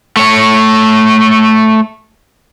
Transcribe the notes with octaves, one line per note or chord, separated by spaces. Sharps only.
A3 C#5